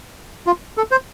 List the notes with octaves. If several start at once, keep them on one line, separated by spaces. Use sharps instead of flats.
F4
A4
C5